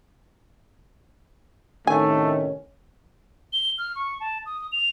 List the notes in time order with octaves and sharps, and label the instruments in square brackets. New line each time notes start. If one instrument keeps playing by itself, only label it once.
[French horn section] A2 C3 D#3 [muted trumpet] A3 [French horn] C#4 [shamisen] G#5
[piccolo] G7
F6
C#6
A5
D#6
F7